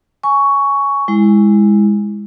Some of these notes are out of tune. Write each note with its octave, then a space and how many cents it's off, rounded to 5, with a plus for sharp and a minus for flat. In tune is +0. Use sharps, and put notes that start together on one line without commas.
G#5 +5 C#6 +10
G#3 -15 E4 +0